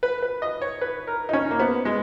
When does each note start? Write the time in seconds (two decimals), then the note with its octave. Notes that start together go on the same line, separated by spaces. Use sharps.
0.03 B4
0.22 B4
0.42 D#5
0.62 C#5
0.81 B4
1.07 A#4
1.29 D#4
1.33 C#4
1.51 A#3
1.60 B3
1.85 G#3